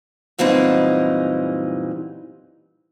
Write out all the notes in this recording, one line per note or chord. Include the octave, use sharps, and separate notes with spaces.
F#2 A#2 E3 G3 C4 D#4